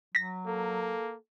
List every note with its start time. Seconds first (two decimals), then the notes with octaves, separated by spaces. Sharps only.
0.15 F#3 A#6 B6
0.46 A#3 A4